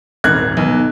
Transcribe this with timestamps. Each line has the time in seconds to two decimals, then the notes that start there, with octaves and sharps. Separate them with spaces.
0.24 D#1 G#1 F#6 G#6
0.57 B1